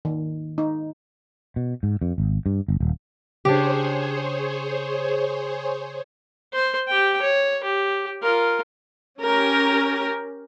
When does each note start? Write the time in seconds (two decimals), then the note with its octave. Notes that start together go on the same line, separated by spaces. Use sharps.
0.05 D#3
0.58 D#4
1.56 B2
1.83 G#2
2.02 F2
2.18 G#1
2.46 G2
2.68 G1
2.80 D#1
3.45 C#3 D4 G4 G#4 C5 C#5
6.53 C5
6.88 G4 G5
7.22 C#5
7.64 G4
8.23 F4 A#4
9.21 C#4 G4 A#4